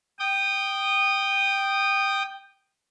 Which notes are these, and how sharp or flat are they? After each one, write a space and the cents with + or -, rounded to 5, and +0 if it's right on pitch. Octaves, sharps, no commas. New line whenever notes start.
G5 +0 D#6 -20